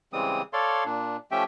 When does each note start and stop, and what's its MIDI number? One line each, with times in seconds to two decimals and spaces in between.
0.13 0.42 49
0.13 0.42 52
0.13 0.42 55
0.13 0.42 56
0.13 0.42 60
0.13 0.42 87
0.53 0.84 69
0.53 0.84 73
0.53 0.84 74
0.53 0.84 77
0.53 0.84 84
0.85 1.17 46
0.85 1.17 62
1.31 1.44 53
1.31 1.44 57
1.31 1.44 61
1.31 1.44 67
1.31 1.44 76
1.31 1.44 79